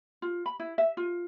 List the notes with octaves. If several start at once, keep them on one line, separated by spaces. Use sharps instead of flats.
F4
B5
E4
E5
F4